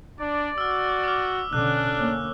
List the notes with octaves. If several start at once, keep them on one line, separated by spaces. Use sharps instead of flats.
D4 D5
F#4 E6 F6
D6 F6
B2 D3 C#4 D4 F#6
A#3 C#4